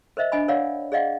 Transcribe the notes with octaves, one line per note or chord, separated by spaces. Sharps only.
A#4 C5 D#5 E5
D4 D#5 G#5 B5
A#4 C#5 D5 F5 F#5
G#4 D5 D#5 F5 F#5